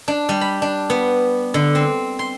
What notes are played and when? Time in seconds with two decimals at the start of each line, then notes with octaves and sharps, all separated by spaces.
0.08 D4
0.29 G3
0.41 B5
0.62 D4
0.90 B3
1.54 D3
1.75 C4
2.19 C6